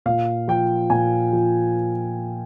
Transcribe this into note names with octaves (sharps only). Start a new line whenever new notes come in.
A#2 F5
F3 G5
A#2 G#5
F3